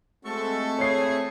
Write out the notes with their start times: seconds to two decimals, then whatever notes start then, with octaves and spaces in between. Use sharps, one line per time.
0.25 G#3 A3 C4 F#4 A4 C#6
0.79 E4 G#4 C#5 C7